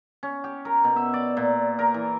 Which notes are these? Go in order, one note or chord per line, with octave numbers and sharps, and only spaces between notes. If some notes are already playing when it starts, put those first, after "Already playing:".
C#4
G4
A#4
B2
E5
D5
A#2
A#4
E3